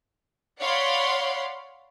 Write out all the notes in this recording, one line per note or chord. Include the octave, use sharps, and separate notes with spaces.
C#5 D5 F5 F#5 B5 C6